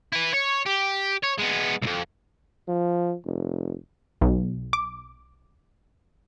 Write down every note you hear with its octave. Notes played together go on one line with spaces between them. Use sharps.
E4 B4
C#5
G4
C#5
G#3 B3
C2 F2
F3
F1
B1
D6